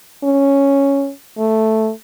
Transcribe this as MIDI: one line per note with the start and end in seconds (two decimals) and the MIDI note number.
0.24 1.11 61
1.38 1.91 57